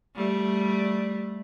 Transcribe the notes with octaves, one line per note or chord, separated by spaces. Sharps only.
G3 A3